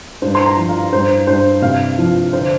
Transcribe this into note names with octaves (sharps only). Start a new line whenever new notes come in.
G2 C5
C6
A#5
F3
F5
G2 C5
G2 C5
C3 F5
F3
D3 C5